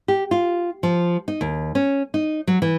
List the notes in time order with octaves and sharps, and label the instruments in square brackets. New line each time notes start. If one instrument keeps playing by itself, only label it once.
[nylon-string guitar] G4
F4
F3
D#4
D#2
C#4
D#4
F#3
E3